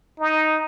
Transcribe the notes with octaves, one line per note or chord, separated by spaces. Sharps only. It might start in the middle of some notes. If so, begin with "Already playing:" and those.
D#4